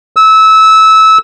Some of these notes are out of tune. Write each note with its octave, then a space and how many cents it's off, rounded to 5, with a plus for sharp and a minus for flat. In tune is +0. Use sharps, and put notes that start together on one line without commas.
E6 -20